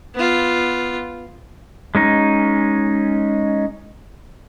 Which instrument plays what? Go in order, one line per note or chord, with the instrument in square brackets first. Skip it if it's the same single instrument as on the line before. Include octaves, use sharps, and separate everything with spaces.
[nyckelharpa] B3 F4
[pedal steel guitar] G#3 C#4 D#4